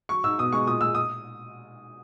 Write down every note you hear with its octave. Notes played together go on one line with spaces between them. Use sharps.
F#3 C#6
G#2 E6
B2 D#6
G#3 C#6
A#2 D#6
G#3 E6
D#6